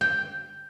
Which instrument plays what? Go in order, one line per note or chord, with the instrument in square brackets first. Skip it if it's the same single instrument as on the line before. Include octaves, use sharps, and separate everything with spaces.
[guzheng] G5